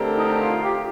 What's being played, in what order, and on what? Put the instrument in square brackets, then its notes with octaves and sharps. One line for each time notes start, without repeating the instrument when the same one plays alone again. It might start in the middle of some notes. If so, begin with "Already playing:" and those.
Already playing: [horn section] D3 A3 C4 G4 A#4
[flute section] D#4
D#4
F4
G4